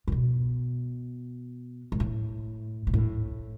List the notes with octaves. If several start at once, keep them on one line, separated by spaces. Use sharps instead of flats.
A#2
B2
G#2
A2
A#2
A2